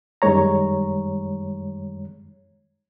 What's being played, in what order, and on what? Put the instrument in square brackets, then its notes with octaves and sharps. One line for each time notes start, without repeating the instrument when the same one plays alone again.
[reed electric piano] F#2 D#3 G3 G#3 C#5 A#5